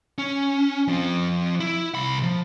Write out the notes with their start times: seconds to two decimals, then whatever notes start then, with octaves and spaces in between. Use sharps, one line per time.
0.18 C#4
0.88 F3 C4
1.60 E4
1.95 C2 B5
2.23 F3